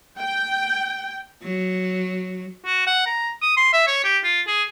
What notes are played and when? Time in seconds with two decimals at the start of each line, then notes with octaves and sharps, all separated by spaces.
0.19 G5
1.43 F#3
2.66 F#4
2.87 F#5
3.06 A#5
3.42 D#6
3.57 C6
3.73 E5
3.87 C#5
4.05 G4
4.24 F4
4.47 G#4